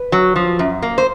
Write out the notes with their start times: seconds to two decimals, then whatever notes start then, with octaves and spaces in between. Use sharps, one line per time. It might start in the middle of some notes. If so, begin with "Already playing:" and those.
Already playing: B4
0.12 F#3
0.36 F3
0.59 F#2
0.82 A#3
0.98 C5